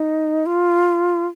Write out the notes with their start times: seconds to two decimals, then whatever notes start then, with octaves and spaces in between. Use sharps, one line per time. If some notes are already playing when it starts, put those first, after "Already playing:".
Already playing: D#4
0.46 F4